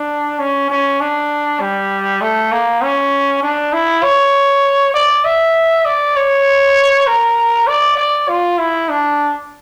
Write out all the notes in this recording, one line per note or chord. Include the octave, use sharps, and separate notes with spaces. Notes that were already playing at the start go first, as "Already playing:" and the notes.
Already playing: D4
C#4
C#4
D4
G3
A3
A#3
C#4
D4
E4
C#5
D5
E5
D5
C#5
A#4
D5
D5
F4
E4
D4